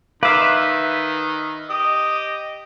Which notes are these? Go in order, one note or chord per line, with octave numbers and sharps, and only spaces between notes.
D#3 B4 E5 F5 D6
G4 D#5 D#6